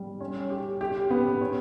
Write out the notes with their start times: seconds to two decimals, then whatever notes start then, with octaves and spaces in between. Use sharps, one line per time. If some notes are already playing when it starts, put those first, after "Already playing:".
Already playing: G3
0.20 C#4
0.50 G4
0.81 G4
1.10 B3
1.41 C#4